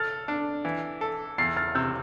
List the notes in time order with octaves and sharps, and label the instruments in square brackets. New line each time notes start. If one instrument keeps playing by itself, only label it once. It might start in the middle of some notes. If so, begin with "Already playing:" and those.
Already playing: [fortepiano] A4 [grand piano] F6 A6
[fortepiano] D4
E3
A4
[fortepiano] E2 [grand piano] A6 C7
[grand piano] F6 A6
[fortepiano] C3 [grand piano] E6 G6